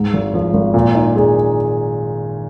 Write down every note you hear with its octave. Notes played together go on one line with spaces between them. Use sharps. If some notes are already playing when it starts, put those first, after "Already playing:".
Already playing: G#2
G#1
F3
G#1
A#2
D#4
G#3